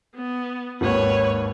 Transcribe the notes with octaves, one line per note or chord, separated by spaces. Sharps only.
B3
G#1 D#2 B4 C#5